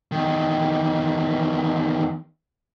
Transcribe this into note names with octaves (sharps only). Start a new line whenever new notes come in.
E2 D#3